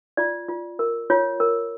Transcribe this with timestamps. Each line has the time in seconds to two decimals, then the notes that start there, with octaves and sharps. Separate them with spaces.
0.17 F4 D5
0.48 F4
0.79 A#4
1.10 F4 C#5
1.40 A#4